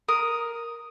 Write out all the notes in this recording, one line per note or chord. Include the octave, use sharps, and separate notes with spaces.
A#4 D#6